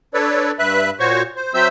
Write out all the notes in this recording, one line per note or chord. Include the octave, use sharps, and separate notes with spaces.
D4 A4 B4 C#5 D5
G2 B4 E5 F#6
A#2 F#4 C5 C#5 C#6
C5
F#3 C4 C5 E5 E6 G6